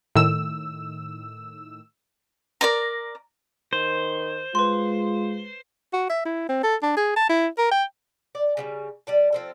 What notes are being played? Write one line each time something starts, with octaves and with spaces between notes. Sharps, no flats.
A2 D#3 E6
A#4 D5 A#5
D#3 C5
G#3 F4 B4 C6
F#4
E5
E4
C4
A4
D4
G#4
A5
E4
A#4
G5
D5
C#3 F3 G3
G3 D5 A5
F3 C4 A4